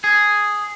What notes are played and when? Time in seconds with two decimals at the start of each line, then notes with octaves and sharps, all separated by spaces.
0.04 G#4